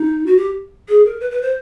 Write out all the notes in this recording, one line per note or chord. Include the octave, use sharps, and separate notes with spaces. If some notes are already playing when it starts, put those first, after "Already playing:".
Already playing: D#4
F#4
G4
G#4
A#4
B4
B4
C5